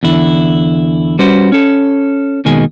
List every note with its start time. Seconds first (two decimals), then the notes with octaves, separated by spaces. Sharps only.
0.03 E2 D3 E4
1.19 G3 C#4 F#4 B4 C5
1.52 C#4 A4
2.45 D#2 B2 D#3 G#3 G#5